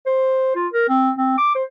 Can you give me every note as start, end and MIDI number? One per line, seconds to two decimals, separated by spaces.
0.06 0.54 72
0.56 0.67 65
0.73 0.85 70
0.89 1.11 60
1.18 1.33 60
1.38 1.52 86
1.55 1.63 72